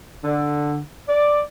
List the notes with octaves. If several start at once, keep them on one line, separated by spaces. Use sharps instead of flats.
D3
D5